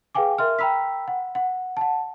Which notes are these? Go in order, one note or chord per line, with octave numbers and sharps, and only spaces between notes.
G#4 B4 F5 G5 G#5 D6
A#4 E5 C6 F6
G5 A#5 B5 E6 B6
F#5
F#5
F#5 A5